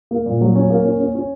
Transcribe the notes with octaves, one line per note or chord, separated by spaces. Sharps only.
A#3
A#2
F#3
C#4
A#3
C#4
C#4
C#4